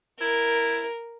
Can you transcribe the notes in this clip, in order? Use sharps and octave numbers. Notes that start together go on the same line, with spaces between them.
E4 A#4